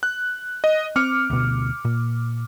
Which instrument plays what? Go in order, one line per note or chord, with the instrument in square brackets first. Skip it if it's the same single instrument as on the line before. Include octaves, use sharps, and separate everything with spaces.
[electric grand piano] F#6
D#5
[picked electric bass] C4 [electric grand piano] D6 F6 C#7
[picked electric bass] D2 B2
A#2